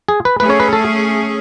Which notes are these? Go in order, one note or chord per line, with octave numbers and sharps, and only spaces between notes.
G#4
B4
A3 C#4 G#4 B4
C#5
B4
A4